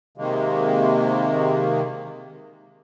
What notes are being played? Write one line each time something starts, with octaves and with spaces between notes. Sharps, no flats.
C3 D#3 G#3 A#3